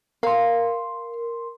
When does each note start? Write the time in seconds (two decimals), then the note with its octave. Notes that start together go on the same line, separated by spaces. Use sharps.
0.23 A#4 F5 C6